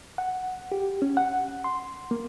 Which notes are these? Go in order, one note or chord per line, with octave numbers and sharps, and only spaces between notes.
F#5
G4
C#4
F#5
C6
A#3